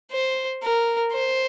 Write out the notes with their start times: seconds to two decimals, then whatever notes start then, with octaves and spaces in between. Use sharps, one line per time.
0.11 C5
0.63 A#4
1.12 C5